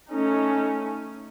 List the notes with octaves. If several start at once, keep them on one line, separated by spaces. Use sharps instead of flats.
A3 C#4 D#4